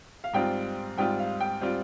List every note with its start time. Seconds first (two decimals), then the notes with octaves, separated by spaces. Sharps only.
0.24 F5
0.33 G#2 G3 C4 F4 G5
0.97 G#2 G3 C4 F4 G5
1.19 F5
1.40 G5
1.62 G3 C4 F4